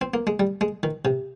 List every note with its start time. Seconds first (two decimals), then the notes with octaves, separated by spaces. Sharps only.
0.01 C4
0.14 A#3
0.27 G#3
0.40 G3
0.61 G#3
0.83 D#3
1.05 C3